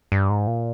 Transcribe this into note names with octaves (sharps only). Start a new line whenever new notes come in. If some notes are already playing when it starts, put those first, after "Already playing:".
G2
G#2
A#2